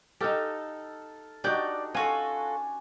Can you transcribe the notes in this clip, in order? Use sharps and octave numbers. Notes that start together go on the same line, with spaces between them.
D#4 G4 A4 F5
D4 D#4 F#4 G4 D5 G6
C#4 F4 F#4 A4 G#5